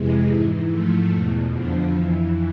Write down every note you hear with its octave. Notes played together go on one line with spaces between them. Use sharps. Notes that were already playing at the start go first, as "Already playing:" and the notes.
Already playing: F2 C3 E3 G#3
G#2 E3
G#2 F3 A3
E2 B2
F2 D3 F3
F2 E3